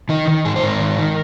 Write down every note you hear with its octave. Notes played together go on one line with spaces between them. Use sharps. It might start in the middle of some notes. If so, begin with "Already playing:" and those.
D#3 D#4
D#3
G#2 G#4
C5
G#2 A#4
D#3
D#3